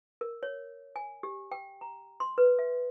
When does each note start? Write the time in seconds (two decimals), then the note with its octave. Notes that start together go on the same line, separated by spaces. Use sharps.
0.21 A#4
0.43 C#5
0.96 G#5
1.23 G4
1.52 G5
1.81 A#5
2.20 C6
2.38 B4
2.59 E5